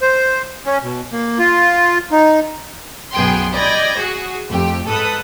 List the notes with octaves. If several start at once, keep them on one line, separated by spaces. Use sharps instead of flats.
C5
C#4
B2
A#3
F4
D#4
B1 F#2 B3 G#4 G5 C6
D5 D#5 G5 B5 G#6 A#6
F#4 G#4
F2 A3 G4
G#2 A4 B4 D#6